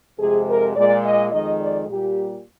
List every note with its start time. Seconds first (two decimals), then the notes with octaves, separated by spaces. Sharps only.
0.19 F2 C3 F3 G#3 G#4
0.48 A#4
0.76 A#2 G#3 D5
1.04 D#5
1.32 F2 D#3 G#3 D#5
1.60 D5
1.88 A#2 G3 G4